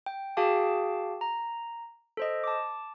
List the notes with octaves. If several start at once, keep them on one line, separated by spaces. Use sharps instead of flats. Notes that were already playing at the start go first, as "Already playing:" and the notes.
G5
F#4 G#4 F5 G5 A5 D6
A#5
A4 C5 D#5
A5 D6